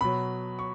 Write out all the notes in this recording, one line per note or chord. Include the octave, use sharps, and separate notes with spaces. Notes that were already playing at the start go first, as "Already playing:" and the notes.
B2 F#3 B5
C#6